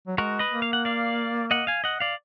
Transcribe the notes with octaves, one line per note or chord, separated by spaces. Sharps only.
F#3
G#3 F#4 A#4
B4 D#5
A#3
F5
F#5
D5 F5
D#5 F#5
F5 G#5
D#5 F#5
D5 F5